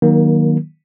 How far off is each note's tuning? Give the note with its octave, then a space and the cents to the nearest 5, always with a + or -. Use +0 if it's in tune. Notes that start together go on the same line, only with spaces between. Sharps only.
D#3 +0 F#3 +0 A#3 +30